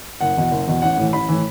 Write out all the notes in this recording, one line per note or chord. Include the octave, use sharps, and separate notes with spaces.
F#1 F#5
E2 B2
F#1
E2 B2
A1 F#5
A2 E3
A1 B5
A2 E3